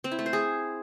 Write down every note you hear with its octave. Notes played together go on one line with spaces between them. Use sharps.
C4
E4
A3
C5
G#4